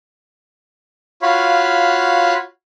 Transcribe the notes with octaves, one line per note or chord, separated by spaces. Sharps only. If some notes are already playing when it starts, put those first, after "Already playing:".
F4 F#4 C#5 F5 B5